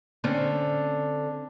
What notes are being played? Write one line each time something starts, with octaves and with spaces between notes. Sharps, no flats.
D3 C4 C#4